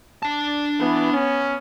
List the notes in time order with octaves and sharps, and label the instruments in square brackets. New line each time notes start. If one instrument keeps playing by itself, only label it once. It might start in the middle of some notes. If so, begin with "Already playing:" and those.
[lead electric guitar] D4 A5
[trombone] E3 [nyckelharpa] B3
[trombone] C#4